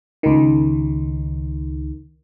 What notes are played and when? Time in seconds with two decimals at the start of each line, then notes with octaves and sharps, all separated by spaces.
0.23 C#2 D#3